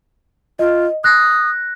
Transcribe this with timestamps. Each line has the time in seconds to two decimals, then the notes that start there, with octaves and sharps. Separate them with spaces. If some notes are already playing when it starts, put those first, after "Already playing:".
0.59 F4 D#5
1.04 D#6 F#6 A#6